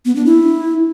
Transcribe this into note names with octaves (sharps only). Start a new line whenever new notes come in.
B3
D4
E4